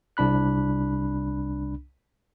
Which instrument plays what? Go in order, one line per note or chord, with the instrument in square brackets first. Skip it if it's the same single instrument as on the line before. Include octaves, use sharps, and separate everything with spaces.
[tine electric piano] C2 D4 B5 F#6